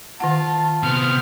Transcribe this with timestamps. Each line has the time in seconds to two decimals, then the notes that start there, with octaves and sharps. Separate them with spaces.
0.20 D#3 F4 F#5 A5
0.83 C3 B3 F4 G#4 C5 F6